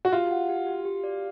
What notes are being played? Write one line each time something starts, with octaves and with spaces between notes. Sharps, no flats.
F#4
F4 G4
F#5
G4
G4
G4
D5